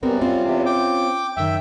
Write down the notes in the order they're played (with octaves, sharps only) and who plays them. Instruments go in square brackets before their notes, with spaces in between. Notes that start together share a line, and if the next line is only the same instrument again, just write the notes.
[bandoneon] F#2 G3 [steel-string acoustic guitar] B3 C4 A#4
[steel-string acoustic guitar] C4 C#4 F4
[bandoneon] E2 C3
G5 D6
[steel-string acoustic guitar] F#2 D#3 [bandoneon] E5 G5